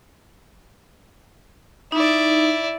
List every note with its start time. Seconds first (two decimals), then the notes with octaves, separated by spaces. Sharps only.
1.92 D#4 E4 D5